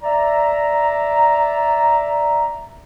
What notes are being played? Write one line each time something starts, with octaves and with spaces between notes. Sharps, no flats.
D5 E5 A#5